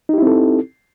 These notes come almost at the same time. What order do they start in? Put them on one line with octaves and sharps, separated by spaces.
D#4 G4 E4 C4 A4